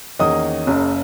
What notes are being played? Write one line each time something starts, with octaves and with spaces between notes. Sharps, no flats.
E2 D#3 A#3 C#4 D#5 D#6
F#1 F#2 C#3